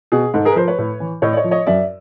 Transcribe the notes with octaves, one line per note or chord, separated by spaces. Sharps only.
B2 G#4
G#2 A4
G#4 A#4
B4
F3 A#4 C5
B4 C#5
A2
E3
A2 C#5 D#5
D5
C#5 D#5
F3
C#5 D#5
F#2 D5 E5